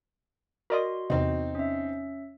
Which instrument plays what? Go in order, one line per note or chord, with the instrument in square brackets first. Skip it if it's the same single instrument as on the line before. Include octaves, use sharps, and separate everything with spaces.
[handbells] F#4 C6 [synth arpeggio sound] A#4 D5 D#5
[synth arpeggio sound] E2 C3 [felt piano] C4 D#4
[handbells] C#4 E5